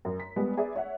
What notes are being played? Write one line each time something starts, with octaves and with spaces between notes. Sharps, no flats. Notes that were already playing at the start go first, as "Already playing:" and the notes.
F#2
B6
G3 G#3 B3 G4
G#4 B4 D5 E5
C#5 E5 F#5